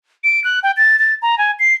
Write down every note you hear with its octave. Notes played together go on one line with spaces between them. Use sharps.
D7
F#6
G5
A6
A6
A#5
G#5
C7